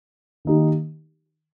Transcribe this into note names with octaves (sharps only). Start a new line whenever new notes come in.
D#3 A#3 D#4 G4